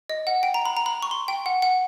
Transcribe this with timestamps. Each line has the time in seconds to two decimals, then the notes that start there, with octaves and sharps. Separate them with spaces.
0.10 D#5
0.27 F#5
0.43 G5
0.54 A#5
0.65 B5
0.77 A#5
0.86 B5
1.02 C#6
1.11 C6
1.28 G5
1.46 F#5
1.62 F#5